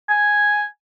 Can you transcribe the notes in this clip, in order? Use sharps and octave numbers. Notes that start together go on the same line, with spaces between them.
G#5